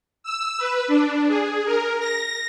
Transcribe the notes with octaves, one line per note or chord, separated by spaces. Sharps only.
E6
B4
D4
G#4
A#4
A#6